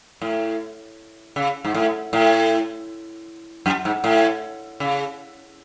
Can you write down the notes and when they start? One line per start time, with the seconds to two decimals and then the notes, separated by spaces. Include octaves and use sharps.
0.21 A2
1.36 C#3
1.65 G#2
1.74 A2
2.13 A2
3.66 F#2
3.85 G#2
4.04 A2
4.80 C#3